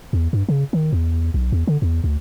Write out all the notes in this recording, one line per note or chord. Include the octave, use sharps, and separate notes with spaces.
E2
G2
C#3
D#3
E2
B1
E2
D3
E2
D2